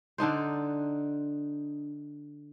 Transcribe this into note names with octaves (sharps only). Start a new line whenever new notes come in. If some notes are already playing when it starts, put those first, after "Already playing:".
D3 D4 D#4 C5